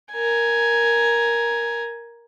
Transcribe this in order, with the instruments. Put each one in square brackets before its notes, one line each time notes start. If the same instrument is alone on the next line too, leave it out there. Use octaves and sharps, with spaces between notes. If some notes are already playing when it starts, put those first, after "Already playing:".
[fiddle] A#4 G#5